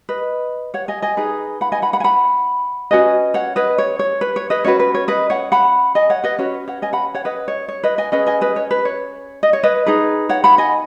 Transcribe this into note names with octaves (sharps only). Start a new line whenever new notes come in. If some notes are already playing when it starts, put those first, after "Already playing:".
B4 D#5
C#5 F#5
D#5 G#5
D#5 G#5
D#4 G#4 B4
F#5 B5
D#5 G#5
F#5 B5
F#5 B5
G#5
F#5 B5
C#4 F#4 B4 D#5 G#5
C#5 F#5
B4 D#5
C#5
C#5
B4
C#5
B4 D#5
C#4 F#4 B4 C#5
B4
C#5
B4 D#5
C#5 F#5
F#5 B5
D#5 G#5
C#5 F#5
B4 D#5
C#4 F#4 B4 C#5
C#5 F#5
D#5 G#5
F#5 B5
C#5 F#5
B4 D#5
C#5
C#5
B4 D#5
D#5 G#5
C#4 G#4 B4 D#5 G#5
D#5 G#5
B4 D#5
C#5
B4
C#5
D#5
C#5
B4 D#5
D#4 G#4 B4
C#5 F#5
F#5 B5
D#5 G#5